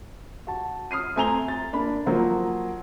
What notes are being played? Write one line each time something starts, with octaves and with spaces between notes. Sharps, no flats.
F#4 A5
D#6 F6 C7 D#7
A3 C4 G#5 A#5 F7 G7
A6
A#3 D4 B5
F3 F#3 A#3 C5